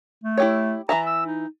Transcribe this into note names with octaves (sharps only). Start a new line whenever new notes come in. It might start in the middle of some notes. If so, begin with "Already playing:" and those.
A3
E4 G4 C#5
E3 E5 A5 A#5
E6
D#4